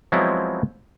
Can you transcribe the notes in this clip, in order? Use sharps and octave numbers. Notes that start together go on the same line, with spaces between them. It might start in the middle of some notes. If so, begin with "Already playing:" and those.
F3 F#3 G#3 B3 C4 E4